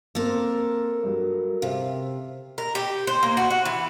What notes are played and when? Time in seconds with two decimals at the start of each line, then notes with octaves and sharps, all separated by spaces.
0.15 A#3 C4 A4 A#4
1.03 G2 F#3
1.62 C3 E5 F5
2.58 A#4
2.75 G4
3.07 C5
3.23 A#3
3.37 F#4
3.50 F#4
3.65 E3